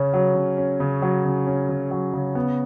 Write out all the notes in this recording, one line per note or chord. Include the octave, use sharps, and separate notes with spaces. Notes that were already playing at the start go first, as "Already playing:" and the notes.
Already playing: C#3 C#4
F#3
C#3
C#4
C#3
F#3
C#3
C#4
C#3
F#3
C#3
B3